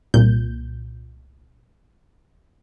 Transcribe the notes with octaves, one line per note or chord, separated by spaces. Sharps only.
C2 A#2 G6